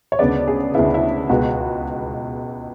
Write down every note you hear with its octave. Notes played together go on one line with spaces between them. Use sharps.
C#5
D2 C#3 G#3 B3 D5
G#4
D2 C#3 G#3 B3 E4
E4
C#2 B2 G#3 B3 F#4